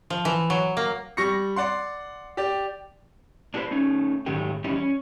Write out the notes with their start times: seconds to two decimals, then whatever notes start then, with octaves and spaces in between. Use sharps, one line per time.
0.10 F3
0.25 E3
0.50 F#3
0.77 A#3
1.17 G3 C#6 A#6 C#7
1.56 D5 F#5 C6
2.37 G4 D5
3.54 D4 E4 G4 A4 B4 C5
3.71 A3 C#4 D#4
4.26 G#2 D#3 F#3 G#3 A3 G4
4.64 E2 G3 C#4 D#4 E4
4.76 C#4